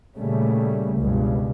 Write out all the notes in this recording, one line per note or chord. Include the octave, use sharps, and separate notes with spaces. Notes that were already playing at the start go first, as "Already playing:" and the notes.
A#2 C#3 G3 A3
C#2 G2 B2